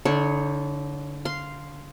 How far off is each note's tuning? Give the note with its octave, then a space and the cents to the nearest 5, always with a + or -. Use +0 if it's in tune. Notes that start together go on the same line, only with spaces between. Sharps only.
D3 -25 D#4 +20 C#5 +0
F5 +0 C6 -5